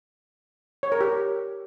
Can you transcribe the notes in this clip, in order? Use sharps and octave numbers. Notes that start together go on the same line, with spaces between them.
C#5
A#4
G4